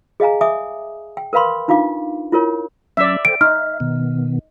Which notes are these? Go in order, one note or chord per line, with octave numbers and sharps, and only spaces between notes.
G#4 D#5 F5 G#5 A#5
E5 G#5 D6 D#6
G5
A#4 B4 F5 B5 C6
D4 D#4 F4 F5 D6
E4 F4 A#4 C#5
F#3 C#4 D5 E5
A4 C5 G5 D7
D#4 E5 F6
B2 D#3 B3